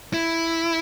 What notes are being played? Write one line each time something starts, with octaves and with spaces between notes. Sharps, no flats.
E4